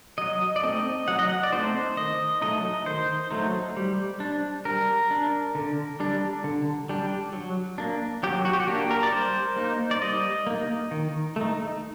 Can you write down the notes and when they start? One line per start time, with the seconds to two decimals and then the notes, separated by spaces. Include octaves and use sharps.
0.18 F#3 D#5
0.56 D5
0.63 A3 C4 D#4 D#5
1.08 F#3 F#5
1.19 D#5
1.29 F#5
1.43 D5
1.52 A3 C4 D#4 C5
1.97 D#3 D#5
2.42 F#3 A3 D#4 D#5
2.86 D#3 C5
3.31 F#3 A3 D#4
3.77 G3
4.20 D4
4.65 G3 A#4
5.11 D4
5.55 D3
6.00 G3 D4
6.44 D3
6.89 G3 D4
7.33 F#3
7.78 A#3 D4
8.23 F#3 G4
8.45 F#4
8.53 G4
8.60 F#4
8.67 A#3 D4 G4
8.91 A#4
9.03 D5
9.12 G3 C5
9.56 A#3 D#4
9.91 D5
10.01 G3 D#5
10.47 A#3 D#4
10.91 D#3
11.36 A3 D#4